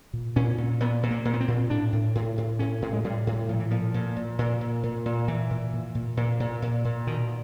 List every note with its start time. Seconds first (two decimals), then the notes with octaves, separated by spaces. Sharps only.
0.13 A#2
0.36 A#2 C#4
0.58 A#2
0.80 A#2 B3
1.03 A#2
1.11 A#3
1.25 A#2
1.34 B3
1.41 C4
1.48 A#2
1.70 A2 D4
1.93 A2
2.15 A2
2.38 A2
2.59 A2 C#4
2.82 A2
2.93 G#3
3.04 A2 G3
3.27 A2
3.49 A#2 F3
3.60 E3
3.71 A#2 F3
3.94 A#2
4.16 A#2
4.39 A#2
4.61 A#2
4.83 A#2
5.06 A#2
5.28 A#2 E3
5.50 A#2
5.73 A#2
5.95 A#2
6.17 A#2
6.40 A#2
6.62 A#2
6.85 A#2
7.07 B2 D#3